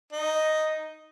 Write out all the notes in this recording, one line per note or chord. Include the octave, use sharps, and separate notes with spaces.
D#4